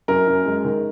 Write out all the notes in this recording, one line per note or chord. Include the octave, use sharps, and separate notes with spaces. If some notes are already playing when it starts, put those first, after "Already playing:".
F#2 A#4
F#2
G#3
D#3